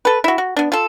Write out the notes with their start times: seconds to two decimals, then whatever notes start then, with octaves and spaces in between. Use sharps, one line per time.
0.05 A4 B4
0.24 E4 F#4
0.38 F#4
0.57 B3 D4
0.72 F4 A4